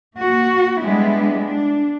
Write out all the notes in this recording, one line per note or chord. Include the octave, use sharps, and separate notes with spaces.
A#3 F#4
G3 G#3 B3 D4 E4
D4